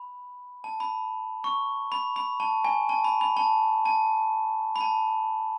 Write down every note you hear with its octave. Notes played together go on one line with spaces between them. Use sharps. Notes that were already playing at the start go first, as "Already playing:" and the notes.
Already playing: B5
A5
B5
C#6
B5
B5
A5
G#5
A5
B5
B5
A5
A5
B5
A5